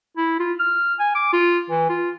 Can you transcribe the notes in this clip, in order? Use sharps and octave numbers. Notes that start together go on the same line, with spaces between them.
E4
F4
F6
G#5
D6
F4
E3
F4